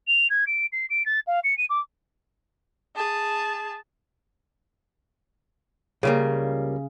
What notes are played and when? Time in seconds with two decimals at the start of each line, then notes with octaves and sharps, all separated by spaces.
0.07 F7
0.30 G#6
0.47 D7
0.73 C7
0.90 D7
1.06 A6
1.27 F5
1.44 C#7
1.58 D#7
1.70 D6
2.96 G#4 A5
6.03 C#2 C#3 G3 A#3